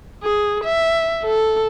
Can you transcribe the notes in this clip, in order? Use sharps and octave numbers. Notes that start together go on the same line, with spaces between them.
G#4
E5
A4